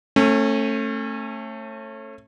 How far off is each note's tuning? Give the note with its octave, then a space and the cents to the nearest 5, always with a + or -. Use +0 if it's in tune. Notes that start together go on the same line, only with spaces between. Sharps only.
A3 +15 C#4 -30